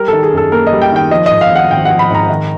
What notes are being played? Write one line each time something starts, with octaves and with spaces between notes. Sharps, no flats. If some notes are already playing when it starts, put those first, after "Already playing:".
Already playing: G3 A#4
D#3 A4
G#4
F#2 A4
A#3 A#4
D#5
G3
G5
D#3 G5
F3 D#5
D#5
G#2
F5
G#1 F#5
G#1 G5
F3 F#5
B5
G#2 A#5
D#3